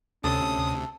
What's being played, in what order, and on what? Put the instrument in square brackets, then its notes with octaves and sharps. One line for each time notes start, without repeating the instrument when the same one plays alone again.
[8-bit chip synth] D2 C3 [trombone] C#4 [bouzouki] A4 [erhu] D#6